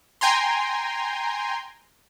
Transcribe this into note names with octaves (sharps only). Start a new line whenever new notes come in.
G5 G#5 A#5 C6